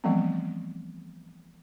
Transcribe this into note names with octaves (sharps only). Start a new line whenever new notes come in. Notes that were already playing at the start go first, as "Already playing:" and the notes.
E3 F3 G3 A3 B3 C4